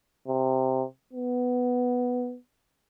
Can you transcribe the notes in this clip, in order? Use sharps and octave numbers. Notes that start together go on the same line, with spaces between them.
C3
B3